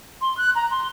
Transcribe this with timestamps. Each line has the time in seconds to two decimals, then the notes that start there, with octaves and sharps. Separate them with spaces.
0.21 C6
0.37 F#6
0.55 A#5
0.71 C6